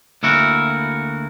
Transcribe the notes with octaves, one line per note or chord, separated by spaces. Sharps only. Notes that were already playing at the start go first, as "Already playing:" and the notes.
D2 A#3 E4 F#4